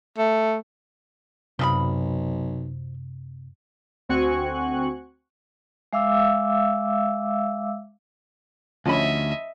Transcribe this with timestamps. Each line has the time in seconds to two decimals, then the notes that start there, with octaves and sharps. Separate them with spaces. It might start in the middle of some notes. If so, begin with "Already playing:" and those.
0.18 A3
1.59 B1 F#2 C3 F3 A4 B5 D#6
4.09 D2 C4 F#4 G#5 C#6 F#6
5.93 G#3 E5 F5 D6 E6
8.86 D2 F3 C#4 D#5 E5 B5